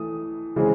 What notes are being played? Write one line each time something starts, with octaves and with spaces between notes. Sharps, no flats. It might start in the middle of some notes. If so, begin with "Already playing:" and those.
Already playing: E3 A3 D#6
C#3 E3 G#3 C4